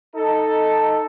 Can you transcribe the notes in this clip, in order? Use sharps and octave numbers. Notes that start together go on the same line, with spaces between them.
D#4 A4